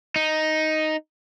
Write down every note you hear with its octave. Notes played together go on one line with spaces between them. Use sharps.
D#4